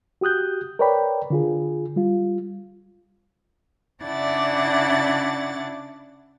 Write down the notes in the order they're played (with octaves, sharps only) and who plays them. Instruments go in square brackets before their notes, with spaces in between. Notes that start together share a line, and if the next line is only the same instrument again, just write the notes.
[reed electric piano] F#4 G4 D#6 F#6 G6
A#4 B4 C#5 D5 G5 B5
D3 F4 G#4
G3 F4
[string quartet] C#3 D4 E4 D5 F#5 A6